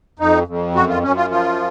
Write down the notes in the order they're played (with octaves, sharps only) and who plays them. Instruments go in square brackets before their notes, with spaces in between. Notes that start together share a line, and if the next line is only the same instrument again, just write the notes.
[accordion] F2 D#4
F2
F#2 F#4
F4
F#2 C#4
F4
F3 F4